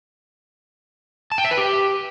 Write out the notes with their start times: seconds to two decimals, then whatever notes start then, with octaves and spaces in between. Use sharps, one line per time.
1.32 A5
1.38 G5
1.45 E5
1.51 B4
1.58 G4